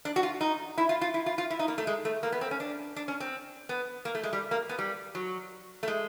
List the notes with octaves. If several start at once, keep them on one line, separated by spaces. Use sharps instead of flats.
D4
F#4
F4
D#4
E4
F4
F4
E4
F4
F4
E4
D#4
A#3
A3
G#3
A3
A#3
B3
C4
C#4
D4
D4
C#4
C4
B3
A#3
A3
G#3
G3
A#3
B3
G3
F#3
A3
G#3